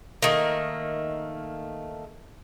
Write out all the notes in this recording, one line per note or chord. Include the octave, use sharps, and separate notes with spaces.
D#3 A3 A#3